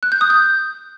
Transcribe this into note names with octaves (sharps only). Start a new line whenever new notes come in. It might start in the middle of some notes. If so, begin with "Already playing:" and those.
F#6
G6
D#6
G6